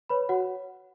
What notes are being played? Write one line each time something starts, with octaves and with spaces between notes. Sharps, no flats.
B4 C#5 B5
F#4 C#5 F#5